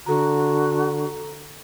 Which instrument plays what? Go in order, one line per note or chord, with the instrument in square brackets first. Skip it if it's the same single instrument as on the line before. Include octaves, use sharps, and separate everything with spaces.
[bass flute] D3 [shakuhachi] F#4 [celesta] A4 A#5